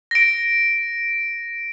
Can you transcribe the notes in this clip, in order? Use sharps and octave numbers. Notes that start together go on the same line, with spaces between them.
A#6 D7